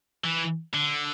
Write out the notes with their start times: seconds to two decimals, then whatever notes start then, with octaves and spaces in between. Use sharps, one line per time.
0.24 E3
0.74 D3